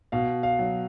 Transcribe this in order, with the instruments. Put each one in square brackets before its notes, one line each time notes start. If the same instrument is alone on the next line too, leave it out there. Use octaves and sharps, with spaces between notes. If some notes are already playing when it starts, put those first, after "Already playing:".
[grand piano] B2 F5
F5
F#3